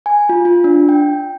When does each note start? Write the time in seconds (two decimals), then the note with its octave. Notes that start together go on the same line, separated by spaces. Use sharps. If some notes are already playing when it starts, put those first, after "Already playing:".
0.06 G#5
0.29 F4
0.45 F4
0.64 D4
0.89 G5